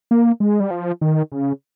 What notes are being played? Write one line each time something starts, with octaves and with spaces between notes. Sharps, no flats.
A#3
G#3
G3
F3
D#3
C#3